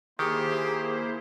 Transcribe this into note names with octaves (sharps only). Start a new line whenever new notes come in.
D#3 A#3 E4 G4 G#4 C5